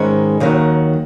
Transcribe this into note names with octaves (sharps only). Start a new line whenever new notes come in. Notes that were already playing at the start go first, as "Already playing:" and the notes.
Already playing: G#2 D#3 G#3 C#4 E4
D#2 D#3 F#3